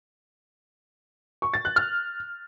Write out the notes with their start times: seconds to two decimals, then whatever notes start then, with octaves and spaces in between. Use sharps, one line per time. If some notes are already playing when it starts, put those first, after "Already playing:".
1.42 C#6
1.54 A6
1.65 F#6
1.76 F6